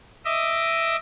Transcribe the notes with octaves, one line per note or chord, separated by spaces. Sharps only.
D#5 E5 D6 D#6